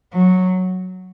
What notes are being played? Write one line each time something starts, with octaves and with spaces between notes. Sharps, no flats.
F#3